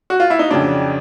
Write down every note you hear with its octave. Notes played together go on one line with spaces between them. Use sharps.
F#4
F4
E4
D#4
F2 C#3 F#3 D4